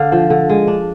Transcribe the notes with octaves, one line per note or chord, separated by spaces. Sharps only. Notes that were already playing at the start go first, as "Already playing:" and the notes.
Already playing: D3 D4 F5
F3
D3
G#3
D4